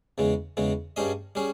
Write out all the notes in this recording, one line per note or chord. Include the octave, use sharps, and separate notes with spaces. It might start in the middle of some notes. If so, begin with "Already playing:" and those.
E2 C#3 G#3
E2 C#3 G#3
G2 G3 C#4 G#4 D#5
G3 C#4 G#4